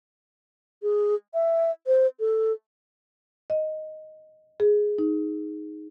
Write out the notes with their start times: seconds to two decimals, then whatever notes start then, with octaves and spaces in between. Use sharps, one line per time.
0.83 G#4
1.34 E5
1.87 C5
2.20 A4
3.50 D#5
4.60 G#4
4.99 D#4